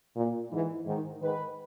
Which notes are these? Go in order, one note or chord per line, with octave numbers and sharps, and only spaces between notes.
A#2
G#2 E3
G#2 D#3
G#2 D#3 B4